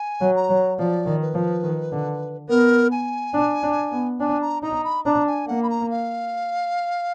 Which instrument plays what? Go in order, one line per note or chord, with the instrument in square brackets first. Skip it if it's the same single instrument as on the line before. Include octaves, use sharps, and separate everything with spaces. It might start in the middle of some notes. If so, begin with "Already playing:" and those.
Already playing: [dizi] G#5
[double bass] F#3
[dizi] A#5
[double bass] F#3
[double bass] F3 [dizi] D5
[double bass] D#3
[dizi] B4
[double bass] F3
D#3
D3
[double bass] B3 [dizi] A#4
[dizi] G#5
[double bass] D4
D4
B3
[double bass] D4 [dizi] G#5
[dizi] A#5
[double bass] D#4 [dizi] A#5
[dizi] B5
[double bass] D4 [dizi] A#5
[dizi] G#5
[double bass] A#3 [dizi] F#5
[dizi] B5
A#5
F5